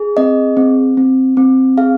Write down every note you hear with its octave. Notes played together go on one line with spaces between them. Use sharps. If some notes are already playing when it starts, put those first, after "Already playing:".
Already playing: G#4
C4 D#5
C4
C4
C4
G#4 F5